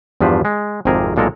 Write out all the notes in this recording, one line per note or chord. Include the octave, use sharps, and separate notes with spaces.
E2 G2 F3 G4 B4 C5
G#3
G#1 F2 C3 G4 G#4 A#4
B1 A#2 G#3 A4 A#4